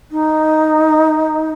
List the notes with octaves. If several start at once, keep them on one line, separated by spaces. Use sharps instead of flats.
D#4